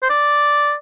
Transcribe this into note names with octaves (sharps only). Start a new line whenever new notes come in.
C5
D5